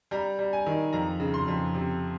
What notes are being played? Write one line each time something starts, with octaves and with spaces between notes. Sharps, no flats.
G3 A#5
G3
G#5
D#3
F2 A#5
C#3
C6
F2
C3